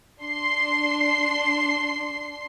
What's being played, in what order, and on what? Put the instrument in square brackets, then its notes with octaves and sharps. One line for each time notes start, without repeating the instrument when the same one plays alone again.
[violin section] D4 C6 C7